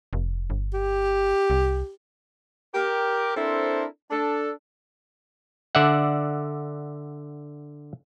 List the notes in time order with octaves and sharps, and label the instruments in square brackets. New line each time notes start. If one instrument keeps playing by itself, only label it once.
[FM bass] F1
G1
[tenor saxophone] G4
[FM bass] C2
[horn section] G4 A#4
C4 D4 E4 A4 A#4 C5
D4 A4
[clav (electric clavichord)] D3 D5 E5 F#5